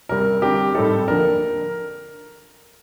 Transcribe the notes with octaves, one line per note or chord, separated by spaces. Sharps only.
C3 G3 C4 A#4
D3 G3 C4 G4
A2 G3 C4 D#4 A4
D3 F3 A#3 D4 A#4